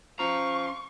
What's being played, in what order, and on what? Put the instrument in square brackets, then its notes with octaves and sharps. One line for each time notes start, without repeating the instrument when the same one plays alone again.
[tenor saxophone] F3 [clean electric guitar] C#4 A#5 [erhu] C#6